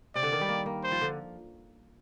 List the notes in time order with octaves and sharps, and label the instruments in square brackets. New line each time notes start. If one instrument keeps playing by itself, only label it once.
[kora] C3 [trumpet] D5
[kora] D3
D#3
G3
A#3
A#3
[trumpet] C5
[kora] F3
D3